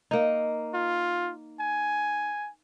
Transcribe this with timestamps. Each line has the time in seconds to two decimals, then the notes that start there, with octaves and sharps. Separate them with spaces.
0.11 A#3 D#4
0.74 F4
1.60 G#5